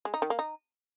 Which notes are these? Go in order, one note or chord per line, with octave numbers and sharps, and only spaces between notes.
G#3
D#4
D#3
A#3
D#4